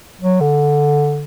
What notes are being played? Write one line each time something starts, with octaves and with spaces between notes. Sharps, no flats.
F#3
D3